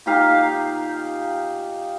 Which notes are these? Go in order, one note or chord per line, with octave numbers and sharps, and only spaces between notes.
A#2 D#4 G4 F5